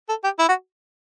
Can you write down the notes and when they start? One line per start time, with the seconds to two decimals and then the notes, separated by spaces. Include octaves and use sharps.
0.09 A4
0.24 G4
0.39 E4
0.49 F#4